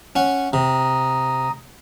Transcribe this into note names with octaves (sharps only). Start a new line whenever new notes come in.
C#4 F#5
C3 A#5 D#6